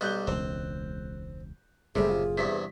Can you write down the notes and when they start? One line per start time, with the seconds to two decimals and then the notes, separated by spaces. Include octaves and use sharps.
0.01 B1 G3 A#5 F#6 G6 G7
0.27 E1 C#2 C4
1.95 F#1 A2 C3 G3 A3 G#4
2.09 F4
2.38 E2 G2 C3 B6